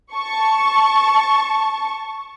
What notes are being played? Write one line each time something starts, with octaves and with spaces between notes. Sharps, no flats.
A5 C#6